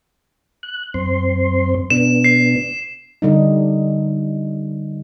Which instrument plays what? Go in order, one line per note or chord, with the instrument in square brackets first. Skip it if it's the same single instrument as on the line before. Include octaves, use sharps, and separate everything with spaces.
[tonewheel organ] F#6
F#2 C4 C6
[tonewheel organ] B2 B3 D4 [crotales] E7
[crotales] C7
[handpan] D3 G3 D#4